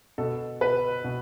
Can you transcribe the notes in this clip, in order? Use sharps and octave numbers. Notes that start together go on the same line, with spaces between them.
B2 A4
B2 B4
B2